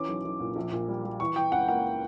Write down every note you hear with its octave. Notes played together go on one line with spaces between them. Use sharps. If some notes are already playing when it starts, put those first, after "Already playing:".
Already playing: E3 C#4 D6
B1
B1
A#2
A#1
A#2
G3
G3
E3 C#6
E3 G5
C#2 F#5
A#3 F#5